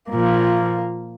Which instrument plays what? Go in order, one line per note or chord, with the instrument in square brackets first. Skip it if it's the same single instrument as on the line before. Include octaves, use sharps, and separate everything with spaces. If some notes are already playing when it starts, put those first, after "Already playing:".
[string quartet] A#2 F3 A#3